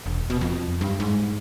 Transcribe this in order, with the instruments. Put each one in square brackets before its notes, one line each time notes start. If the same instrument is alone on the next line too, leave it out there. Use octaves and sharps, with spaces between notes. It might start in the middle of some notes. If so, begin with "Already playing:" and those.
[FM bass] E1
B2
F2
G2
G#2